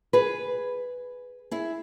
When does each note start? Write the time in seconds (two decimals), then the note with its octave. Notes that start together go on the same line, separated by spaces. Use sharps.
0.13 G#4 B4
1.51 E4 G#4